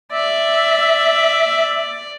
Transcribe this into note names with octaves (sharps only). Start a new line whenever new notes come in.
D5 E5